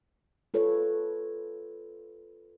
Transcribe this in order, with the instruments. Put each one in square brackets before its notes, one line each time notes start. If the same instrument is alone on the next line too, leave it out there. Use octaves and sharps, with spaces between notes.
[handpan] F4 A4 B4 C#5